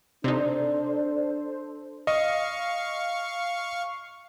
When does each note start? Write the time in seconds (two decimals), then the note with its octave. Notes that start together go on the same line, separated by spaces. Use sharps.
0.24 C3 D4 D#4 A4 C5 D5
2.07 D#5 F5 C#6